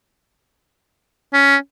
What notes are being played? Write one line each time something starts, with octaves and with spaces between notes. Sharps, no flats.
C#4